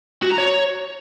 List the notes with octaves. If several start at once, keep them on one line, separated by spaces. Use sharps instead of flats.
F#4
A#5
C#5